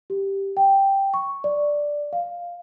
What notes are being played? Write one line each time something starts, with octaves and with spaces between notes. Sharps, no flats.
G4
G5
C#6
D5
F5